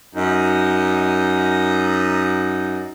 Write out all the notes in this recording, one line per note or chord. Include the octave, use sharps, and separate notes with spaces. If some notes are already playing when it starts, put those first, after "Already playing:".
F#2 D#4